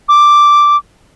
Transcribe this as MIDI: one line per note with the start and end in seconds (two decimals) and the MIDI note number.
0.09 0.76 86